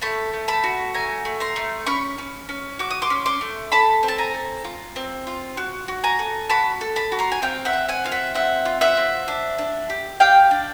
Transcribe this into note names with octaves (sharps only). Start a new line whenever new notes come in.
A3 A5 B5
A3
A5 B5
F#4
A3 G#5 A#5
A3
A#5 C6
A3
C#4 B5 C#6
C#4
C#4
F#4 D6
D#6
C6 D6
C#4
C6 D6
A3
A4 A5 B5
C4
A5
G#5 A#5
A4
F4
C4
F4
F#4
F#4
G#5 A#5
A4
F#4 A5 B5
A4
A5 B5
F#4
A#5 C6
G#5
C4 F5 G5
E5 F#5
C4
F#5 G#5
F4 F5
E5 F#5
C4 E5 F#5
F4
E5 F#5
C4
D4
D4
G4
G4 F5 G5
D4